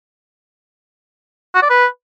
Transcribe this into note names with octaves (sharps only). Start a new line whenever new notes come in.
F#4
D5
B4